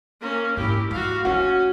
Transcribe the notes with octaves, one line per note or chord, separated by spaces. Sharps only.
A#3 C#4
G#2 E4 G4
G#3 A#3 F#4 F5
A3 C#4 E4 F#4